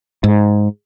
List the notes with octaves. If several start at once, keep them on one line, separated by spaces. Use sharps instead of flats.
G#2